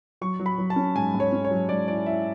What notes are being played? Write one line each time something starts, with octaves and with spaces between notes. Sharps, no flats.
F#3 C#6
F#3
B5
F#3
A5
C#4
G#2 G#5
G#2
C#5
C#4
C#5
F#3
G#2 D5
E4 D5
E4 E5